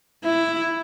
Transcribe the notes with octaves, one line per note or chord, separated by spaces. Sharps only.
E4